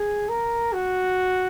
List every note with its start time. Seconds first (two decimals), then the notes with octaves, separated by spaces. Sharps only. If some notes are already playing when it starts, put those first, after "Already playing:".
Already playing: G#4
0.29 A#4
0.73 F#4